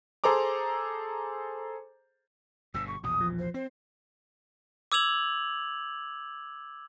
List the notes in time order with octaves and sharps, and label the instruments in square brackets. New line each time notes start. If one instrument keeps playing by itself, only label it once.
[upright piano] G#4 A4 C5 A#5 D6
[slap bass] G1 B2 D3 [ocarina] E6
[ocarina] C#6
[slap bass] A#1 E2 B2 [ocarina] D#6
[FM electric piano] F3
[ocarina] C5
[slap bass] C4 [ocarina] C5
[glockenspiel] D6 E6 G#6 F7 F#7